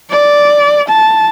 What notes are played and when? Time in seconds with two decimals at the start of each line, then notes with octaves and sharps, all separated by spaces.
0.10 D5
0.89 A5